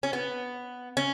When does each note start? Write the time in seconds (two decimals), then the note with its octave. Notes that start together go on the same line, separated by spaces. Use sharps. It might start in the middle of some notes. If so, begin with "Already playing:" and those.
0.03 C#4
0.13 B3
0.97 C#4